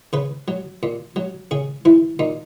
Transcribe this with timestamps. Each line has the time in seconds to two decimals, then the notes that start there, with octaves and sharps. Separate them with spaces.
0.13 C#3 B4
0.48 F#3
0.83 A#2
1.16 F#3
1.51 C#3 G#4
1.85 E3 E4
2.19 A#2 D#4